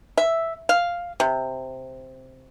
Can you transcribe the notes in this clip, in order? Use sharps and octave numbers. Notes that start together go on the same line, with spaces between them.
E5
F5
C3